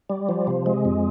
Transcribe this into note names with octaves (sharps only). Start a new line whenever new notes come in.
G3
F3
C3
G#3
F2